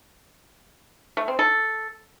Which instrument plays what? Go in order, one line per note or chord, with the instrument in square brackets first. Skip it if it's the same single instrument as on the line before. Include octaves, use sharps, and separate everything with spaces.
[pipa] A3
C4
A4